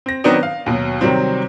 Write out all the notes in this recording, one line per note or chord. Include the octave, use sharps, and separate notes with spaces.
C4 A#6
D#3 F#3 B3 C4 D4 D#4
F5
D#2 B2 F#3
C3 D#3 F#3 G3 C4